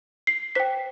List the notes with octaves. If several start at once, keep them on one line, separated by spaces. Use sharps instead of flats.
C7
C5 G5 B6